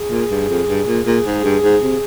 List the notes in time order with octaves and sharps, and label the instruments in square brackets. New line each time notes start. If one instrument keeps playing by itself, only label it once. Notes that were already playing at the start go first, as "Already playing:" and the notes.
Already playing: [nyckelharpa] G#4
[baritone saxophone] A#2
G2
F2
G2
A#2
[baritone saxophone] A#2 [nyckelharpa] G#4
[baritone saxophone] G#2
G2
G#2
C3